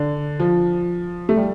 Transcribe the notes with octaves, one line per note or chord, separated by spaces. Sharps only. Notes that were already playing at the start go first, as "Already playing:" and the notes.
Already playing: D3
F3
A3
G3